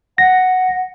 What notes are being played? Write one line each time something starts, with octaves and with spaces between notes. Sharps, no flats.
F#5 A#6